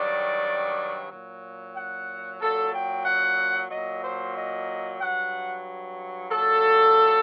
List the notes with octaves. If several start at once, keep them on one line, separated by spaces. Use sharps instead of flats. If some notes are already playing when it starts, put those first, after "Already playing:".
Already playing: G2 D#3 F#3 D5
A#2 F#3
F#5
A#2 F#3 A4
G5
F#5
A#2 F#3 D#5
C5
D#5
G2 F#3 F#5
A#2 F#3 A4